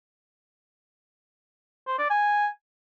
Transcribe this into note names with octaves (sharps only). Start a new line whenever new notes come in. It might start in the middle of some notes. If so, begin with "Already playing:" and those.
C5
D5
G#5